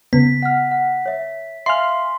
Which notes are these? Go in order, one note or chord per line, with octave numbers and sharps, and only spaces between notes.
C#3 B3 B6
F#5 F6
F#5
C#5 E5
E5 F5 G#5 C6 F6 C7